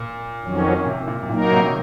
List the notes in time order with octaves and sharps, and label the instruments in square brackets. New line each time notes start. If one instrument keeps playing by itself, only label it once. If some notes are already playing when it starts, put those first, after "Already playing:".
Already playing: [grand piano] A#2
[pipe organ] F2 D#3 F#3 C#4
[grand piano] C3
A#2
C3
[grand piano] A#2 [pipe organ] F#3 A#3 D#4 A#4
[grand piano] C3
D#3